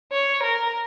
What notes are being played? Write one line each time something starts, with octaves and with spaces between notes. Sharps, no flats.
C#5
A#4